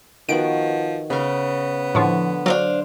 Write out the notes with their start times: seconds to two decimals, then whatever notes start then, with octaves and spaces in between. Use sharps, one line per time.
0.29 D#3 F3 B3 F#4 D7
1.10 C#3 B3 F5
1.95 A2 D3 F3 C#5
2.46 F#3 D4 C5 F5